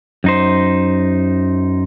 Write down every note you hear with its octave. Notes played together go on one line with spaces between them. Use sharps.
F#2 D#4 C5